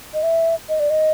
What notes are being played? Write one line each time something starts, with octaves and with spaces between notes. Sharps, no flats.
D#5
E5
D#5
D5
D#5